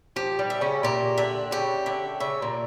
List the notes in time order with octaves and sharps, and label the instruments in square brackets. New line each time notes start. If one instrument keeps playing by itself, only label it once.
[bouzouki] F3 [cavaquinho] G4
[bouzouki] G3
[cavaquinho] E5
[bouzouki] C#3 C#4
[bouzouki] A#2 A#3 [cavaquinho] G4
[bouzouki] D3 D4 [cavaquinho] E5
[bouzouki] C#3 C#4 [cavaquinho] G4
[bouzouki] D3 D4 [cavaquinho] E5
[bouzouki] C#3 C#4 [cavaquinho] E5
[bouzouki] A#2 A#3